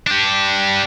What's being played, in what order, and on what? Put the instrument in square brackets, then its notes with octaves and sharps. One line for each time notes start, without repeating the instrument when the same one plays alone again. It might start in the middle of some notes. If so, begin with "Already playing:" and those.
[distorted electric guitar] D4 G4